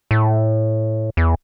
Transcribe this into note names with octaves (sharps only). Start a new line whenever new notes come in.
A2
E2